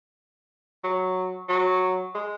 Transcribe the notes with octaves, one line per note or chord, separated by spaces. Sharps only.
F#3
F#3
G#3